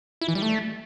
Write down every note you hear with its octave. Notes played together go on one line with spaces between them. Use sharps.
E4
E3
G3
A3